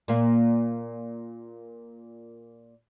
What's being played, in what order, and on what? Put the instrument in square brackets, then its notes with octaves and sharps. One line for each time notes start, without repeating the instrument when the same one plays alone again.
[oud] A#2 A#3